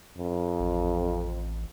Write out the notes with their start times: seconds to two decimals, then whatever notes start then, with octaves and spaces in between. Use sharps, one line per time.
0.18 F2
0.60 A1